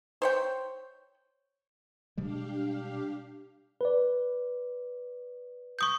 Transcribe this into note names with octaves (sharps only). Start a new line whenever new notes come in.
C5 C#5 G5
B2 G3 G#3 D4 G4 F5
B4 D5
C#6 D#6 G6